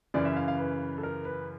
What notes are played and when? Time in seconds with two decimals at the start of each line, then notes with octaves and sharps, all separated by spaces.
0.14 F#2 C#3 E3 D5
0.25 E5
0.36 F5
0.48 F5
0.59 B4
0.98 A4
1.03 A#4
1.25 B4